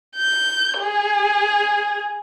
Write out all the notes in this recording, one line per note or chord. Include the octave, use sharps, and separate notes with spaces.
G6
G#4